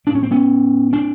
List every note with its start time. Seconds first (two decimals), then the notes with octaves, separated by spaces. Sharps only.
0.07 A2 D4
0.15 C#4
0.23 C4
0.31 B3 C#4
0.93 C4 D4